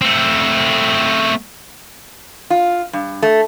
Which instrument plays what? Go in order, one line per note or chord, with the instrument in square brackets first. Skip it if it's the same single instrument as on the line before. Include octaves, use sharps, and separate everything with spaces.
[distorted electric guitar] A3 C4
[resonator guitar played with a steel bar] F4
G2
A3